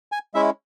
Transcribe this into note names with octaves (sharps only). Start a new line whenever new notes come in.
G#5
G#3 C#4 E4 E5